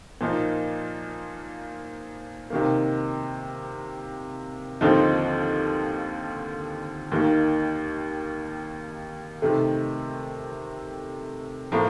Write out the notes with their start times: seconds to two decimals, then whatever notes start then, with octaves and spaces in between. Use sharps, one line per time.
0.21 A#2 F3 A#3 D#4
2.50 C3 D#3 A#3
4.81 D#2 D3 F3 C4 D#4
7.12 D#2 D#3 A#3
9.42 C3 D#3 A3
11.72 A2 F3 A#3 F4 A#4